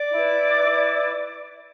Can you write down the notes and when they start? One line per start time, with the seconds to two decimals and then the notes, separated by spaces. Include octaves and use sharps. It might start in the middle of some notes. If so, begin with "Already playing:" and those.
Already playing: D5 D6
0.10 E4 B4
0.62 E4 B4